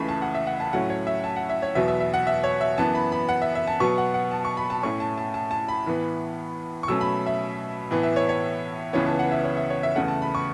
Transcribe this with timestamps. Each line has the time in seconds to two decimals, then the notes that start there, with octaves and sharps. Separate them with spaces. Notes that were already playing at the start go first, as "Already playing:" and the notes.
Already playing: C#2 C#3 E3 A3 B5 C#6
0.09 A5
0.22 F#5
0.34 E5
0.47 F#5
0.60 A5
0.73 A2 F#3 A3 C#4 F#5
0.90 C#5
1.07 E5
1.24 A5
1.36 F#5
1.50 E5
1.62 C#5
1.75 E2 B2 F#3 B3 E5
1.88 E5
2.00 E5
2.14 F#5
2.27 E5
2.44 C#5
2.61 E5
2.78 F#2 E3 B3 A5
2.95 B5
3.12 B5
3.29 F#5
3.42 E5
3.55 E5
3.67 A5
3.80 B2 F#3 B3 C#6
3.98 F#5
4.14 F#5
4.31 A5
4.45 C#6
4.57 B5
4.70 A5
4.83 A2 A3 C#4 C#6
5.00 A5
5.18 A5
5.34 A5
5.51 A5
5.68 B5
5.86 A2 E3 B3
6.83 C#6
6.88 B2 F#3 A3 C#4 E6
7.01 B5
7.27 E5
7.91 A2 E3 B3
8.03 E5
8.16 C#5
8.29 C#5
8.93 C#2 C#3 E3 B3 C#5
9.06 A5
9.19 F#5
9.32 E5
9.44 C#5
9.57 E5
9.70 C#5
9.83 E5
9.96 E2 C#3 A3 F#5
10.08 A5
10.22 B5
10.35 C#6